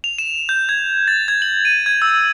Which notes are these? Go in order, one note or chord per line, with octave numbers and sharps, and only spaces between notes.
F7
E7
G6
G#6
A6
G#6
F#7
D#7
G#6
E6